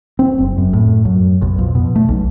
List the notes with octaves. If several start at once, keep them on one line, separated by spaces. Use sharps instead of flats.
C4
F#1
F#2
A2
F#2
B1
F2
B2
A3
B1